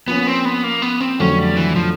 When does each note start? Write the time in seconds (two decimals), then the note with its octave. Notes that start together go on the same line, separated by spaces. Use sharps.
0.08 F3 A#3 B3 C#4
0.27 C4
0.45 B3
0.64 A#3
0.82 B3
1.01 C4
1.19 F2 D3 F#3 A3 C#4
1.39 G3
1.57 E3
1.75 F3